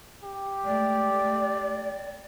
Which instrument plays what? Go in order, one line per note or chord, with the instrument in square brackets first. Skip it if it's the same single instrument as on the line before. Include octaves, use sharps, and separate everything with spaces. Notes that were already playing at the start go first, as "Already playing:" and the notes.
[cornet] G4
[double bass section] G#3 A3 [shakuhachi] D5